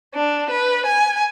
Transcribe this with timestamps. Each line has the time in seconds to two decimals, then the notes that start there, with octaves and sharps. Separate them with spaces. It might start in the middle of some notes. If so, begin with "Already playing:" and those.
0.14 D4
0.51 B4
0.86 G#5